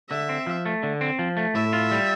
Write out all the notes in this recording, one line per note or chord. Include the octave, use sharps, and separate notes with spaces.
D3 E5
C4
F3
A3
D3
C4
F3
A3
A2 E5
F4
G3